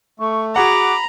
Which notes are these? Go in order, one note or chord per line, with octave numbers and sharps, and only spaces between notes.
A3 C#6
F#4 G#4 F#5 A#5 B5 D6